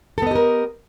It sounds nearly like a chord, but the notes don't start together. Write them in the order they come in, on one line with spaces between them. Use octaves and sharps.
A4 B3 D#5 G4 A#4